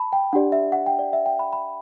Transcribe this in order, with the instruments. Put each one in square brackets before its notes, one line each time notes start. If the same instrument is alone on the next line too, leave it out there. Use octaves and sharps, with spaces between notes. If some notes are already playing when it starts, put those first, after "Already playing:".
Already playing: [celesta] A5 B5
G5
D4 G4 D5 F#5
E5
F#5
G5
D5
E5
G5
B5
B5